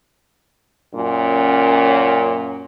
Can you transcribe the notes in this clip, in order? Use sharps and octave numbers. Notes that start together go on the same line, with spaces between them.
F#2 A#2 C#4